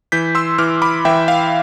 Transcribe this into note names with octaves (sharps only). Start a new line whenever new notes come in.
E3 G6 B6
C6 E6
E3 D6 F6
B5 D6
E3 E5 G5
F5